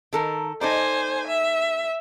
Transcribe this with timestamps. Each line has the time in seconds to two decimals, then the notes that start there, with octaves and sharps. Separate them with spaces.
0.13 D#3 A4 A#4
0.61 D#4 A4 C5 D5 G#5
1.27 E5